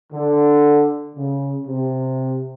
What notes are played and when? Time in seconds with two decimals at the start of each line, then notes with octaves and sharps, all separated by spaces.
0.12 D3
1.16 C#3
1.67 C3